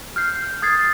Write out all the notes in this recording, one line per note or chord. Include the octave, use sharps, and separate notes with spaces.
F6 G6 C7
D#6 G#6 A6 C7